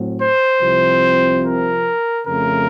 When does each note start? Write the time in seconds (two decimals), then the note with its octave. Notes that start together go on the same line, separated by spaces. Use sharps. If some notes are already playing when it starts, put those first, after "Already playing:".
Already playing: A2 F#3 C4
0.22 C5
0.62 C2 C3 F3 C4
1.44 A#4
2.26 F2 C#3 A3 A#4